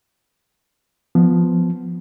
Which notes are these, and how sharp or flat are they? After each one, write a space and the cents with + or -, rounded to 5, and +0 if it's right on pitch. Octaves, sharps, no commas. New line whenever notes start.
F3 +0 B3 +5